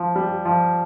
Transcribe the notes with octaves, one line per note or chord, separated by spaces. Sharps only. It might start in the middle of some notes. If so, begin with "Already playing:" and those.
Already playing: F3
G3
F3